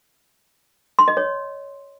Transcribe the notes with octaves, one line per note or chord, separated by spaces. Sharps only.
C6
D#5
C#5